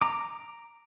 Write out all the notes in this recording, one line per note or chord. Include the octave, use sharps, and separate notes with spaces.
A#5 D6